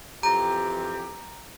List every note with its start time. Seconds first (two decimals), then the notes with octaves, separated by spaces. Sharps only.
0.23 F2 E3 G4 A#5